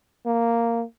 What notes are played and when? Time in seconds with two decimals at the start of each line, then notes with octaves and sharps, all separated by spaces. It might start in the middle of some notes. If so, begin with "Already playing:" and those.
0.26 A#3